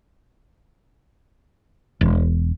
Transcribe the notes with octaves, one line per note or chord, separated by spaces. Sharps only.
E1